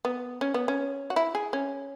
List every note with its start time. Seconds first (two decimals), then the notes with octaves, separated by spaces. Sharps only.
0.05 B3
0.41 C#4
0.54 B3
0.68 C#4
1.10 F#4
1.16 E4
1.35 G#4
1.53 C#4